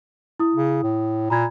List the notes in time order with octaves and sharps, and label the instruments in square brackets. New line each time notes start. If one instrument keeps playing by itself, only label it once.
[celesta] E4 D#6
[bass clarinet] C#3
A2
[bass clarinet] A#2 [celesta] A#5 B5 G#6